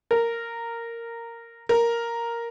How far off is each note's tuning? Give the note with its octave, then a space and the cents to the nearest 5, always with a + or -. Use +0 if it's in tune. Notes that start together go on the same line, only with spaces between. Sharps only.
A#4 -10
A#4 +0